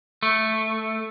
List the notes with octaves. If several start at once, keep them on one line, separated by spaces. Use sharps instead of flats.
A3